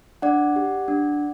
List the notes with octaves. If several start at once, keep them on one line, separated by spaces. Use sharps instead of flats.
D4 D5 F#5
G4
D4